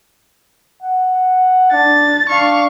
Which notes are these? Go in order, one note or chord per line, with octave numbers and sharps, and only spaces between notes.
F#5
D4 A6
D4 F5 C#6